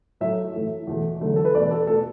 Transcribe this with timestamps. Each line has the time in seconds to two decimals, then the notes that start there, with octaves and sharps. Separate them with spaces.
0.20 A2 F#3 A3 E5
0.54 A2 E3 A3
0.87 E2 B2 A3
1.21 E2 D3 F#3 A3
1.36 A4
1.45 B4
1.54 E2 B2 A3 D5
1.71 A4
1.87 B2 A3 A4